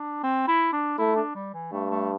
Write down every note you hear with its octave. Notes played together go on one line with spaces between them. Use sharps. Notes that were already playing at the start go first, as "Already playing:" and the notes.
Already playing: D4
C4
E4
D4
A3 E4
D4
G3
E3
G2 A3
A3